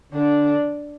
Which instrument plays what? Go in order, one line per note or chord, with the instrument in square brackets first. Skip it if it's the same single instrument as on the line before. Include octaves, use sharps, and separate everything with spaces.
[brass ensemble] D3 [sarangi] D4